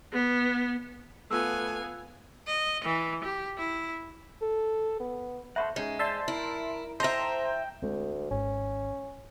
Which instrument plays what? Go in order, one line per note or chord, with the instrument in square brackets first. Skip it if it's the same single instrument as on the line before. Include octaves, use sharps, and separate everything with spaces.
[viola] B3
[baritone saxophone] A3 [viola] B3 [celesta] F4 E6 [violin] F5 G#5
[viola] D#5
E3
G4
E4
[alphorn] A4
B3
[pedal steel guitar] A4 C5 F#5 [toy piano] E5 B5 C#6
[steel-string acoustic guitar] G#3 [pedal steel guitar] C#4 D#4 G#4
[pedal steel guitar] C5 [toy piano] D5 [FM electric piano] E5 A5 C6
[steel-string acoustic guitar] E4 [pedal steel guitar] A#4
[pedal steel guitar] A4 G5 [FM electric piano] C5 A#5 [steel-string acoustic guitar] D#5 E5
[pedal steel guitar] G5
[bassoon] D2 [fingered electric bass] G#3 C4
[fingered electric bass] G#1 G#2 [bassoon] C#4